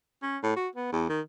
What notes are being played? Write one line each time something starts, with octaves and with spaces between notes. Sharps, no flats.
C#4
A2
F#4
B3
E2
D#3